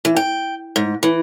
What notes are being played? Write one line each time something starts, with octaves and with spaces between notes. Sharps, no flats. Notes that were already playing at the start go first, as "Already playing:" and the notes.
E3
G5
G#2
E3